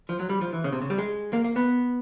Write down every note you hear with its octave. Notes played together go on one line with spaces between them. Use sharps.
F3
F#3
G3
F3
E3
C#3
C3
C#3
G3
G#3
A#3
A#3
B3